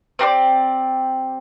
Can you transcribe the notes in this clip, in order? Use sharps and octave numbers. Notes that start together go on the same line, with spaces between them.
C4 G4 B4 D5